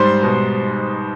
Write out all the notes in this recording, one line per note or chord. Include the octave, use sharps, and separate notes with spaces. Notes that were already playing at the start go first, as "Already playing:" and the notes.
Already playing: G#2 G3 C5 C6
B2